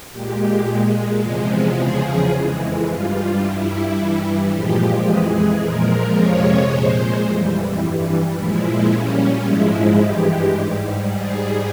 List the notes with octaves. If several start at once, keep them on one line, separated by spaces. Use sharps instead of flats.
A#2 G#3 G4
A#2 G#3
E2 C3 F3 G#3
E2 C#3 F3 G#4
F2 E3 G#3
G2 G3 F4
G2 G3 E4
G2 E3 G3
A#2 F3 G#3 G4
F2 E3 G#3 G#4
A#2 F3 G#3 A#4
F2 C3 F3 G#3 C#5
A#2 G#3 C5
F2 E3 G3
G2 E3 G3
A#2 F3 G#3 E4
A#2 G3 C#4
G#2 F3 G#3 E4
G2 E3 G#3 G4
G#2 G3
G#2 G3 G#4